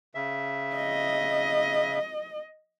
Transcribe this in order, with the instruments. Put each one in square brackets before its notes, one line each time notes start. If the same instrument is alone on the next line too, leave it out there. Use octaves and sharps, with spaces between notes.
[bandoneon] C#3 E5
[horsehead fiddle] D#5